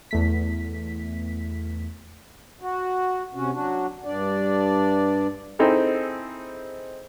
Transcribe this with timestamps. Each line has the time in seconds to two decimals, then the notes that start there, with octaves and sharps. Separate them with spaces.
0.11 E2 A3 B6
2.61 F#4
3.34 C3 C#4 F#4
3.53 F#3 D4 F#4
4.05 G2 D4 D5
5.59 C4 D#4 E4 G#4 A4